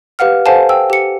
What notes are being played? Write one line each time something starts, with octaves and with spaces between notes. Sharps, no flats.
G4 B4 F5 F#5 F6
A4 C5 F5 F#5 G#5 A5
G5 E6
G4 C#7